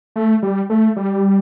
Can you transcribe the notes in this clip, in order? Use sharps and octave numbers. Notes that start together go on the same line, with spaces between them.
A3
G3
A3
G3